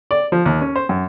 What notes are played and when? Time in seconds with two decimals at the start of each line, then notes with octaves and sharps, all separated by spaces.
0.11 D5
0.32 F3
0.45 D#2
0.61 C#4
0.76 C5
0.89 F#2